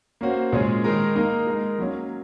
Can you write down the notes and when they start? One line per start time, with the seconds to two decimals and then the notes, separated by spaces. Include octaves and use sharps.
0.21 A#3 C#4 F#4 C5
0.52 A#2 G#3 C#4 G#4
0.84 D#3 G#3 D#4 A#4
1.15 A#3 D#4 A#4
1.47 G#3 D#4 A#4
1.78 F#3 A#3 C#4